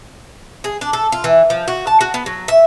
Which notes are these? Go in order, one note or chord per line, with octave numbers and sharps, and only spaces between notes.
G#4
D4
A4
F4
E3
F3
F#4
A5
F#4
B3
F#3
E5